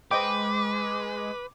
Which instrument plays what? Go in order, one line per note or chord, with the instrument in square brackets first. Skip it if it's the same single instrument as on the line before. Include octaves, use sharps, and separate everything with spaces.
[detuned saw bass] G#3 [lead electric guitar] B4 [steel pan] C5 D#5 G5 [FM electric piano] D6